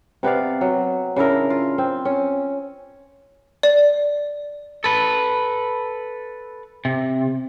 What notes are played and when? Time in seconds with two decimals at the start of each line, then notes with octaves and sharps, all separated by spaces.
0.23 C3 B3 D5 F5
0.61 F#3
1.16 C#3 D4 E4 A#4
1.50 F4
1.78 C4
2.05 C#4
3.63 D5
4.84 A4 B4
6.85 C3